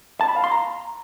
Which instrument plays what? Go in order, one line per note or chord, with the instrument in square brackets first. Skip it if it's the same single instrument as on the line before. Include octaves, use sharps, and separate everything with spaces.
[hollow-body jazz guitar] A5
B5
F5
C6
A#5